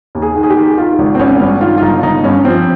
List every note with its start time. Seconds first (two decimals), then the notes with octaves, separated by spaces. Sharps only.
0.15 D#2
0.22 G#4
0.36 D#3
0.43 G#4
0.50 G4
0.57 D#3
0.77 D#3 F4
0.99 G#1
1.15 C4
1.19 G#1 C#4
1.41 G2
1.61 D#3 F4
1.78 F4
1.82 G1 D#4
2.03 G1 D#4
2.24 G2 C#4
2.45 F3 C4